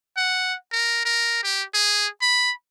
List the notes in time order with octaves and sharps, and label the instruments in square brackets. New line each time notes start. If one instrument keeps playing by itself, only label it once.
[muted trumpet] F#5
A#4
A#4
G4
G#4
B5